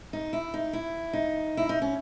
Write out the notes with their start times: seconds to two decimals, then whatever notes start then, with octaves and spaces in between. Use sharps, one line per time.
0.13 D#4
0.33 E4
0.54 D#4
0.73 E4
1.13 D#4
1.57 E4
1.69 D#4
1.82 C#4